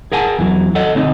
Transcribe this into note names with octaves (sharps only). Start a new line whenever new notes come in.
G#4 A#4 F#5 G#5 A5
E2 E3 F#3
A4 C#5 D#5 F#5
D2 C4 D#4 D#5